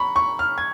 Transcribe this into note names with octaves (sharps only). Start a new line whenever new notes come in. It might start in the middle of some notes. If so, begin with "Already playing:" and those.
Already playing: A#5 B5 C#6
C#6
F6
G#6